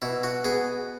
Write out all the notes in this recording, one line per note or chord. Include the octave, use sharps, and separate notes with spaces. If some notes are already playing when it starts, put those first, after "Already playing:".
B2 E4
F#4
B3 G#4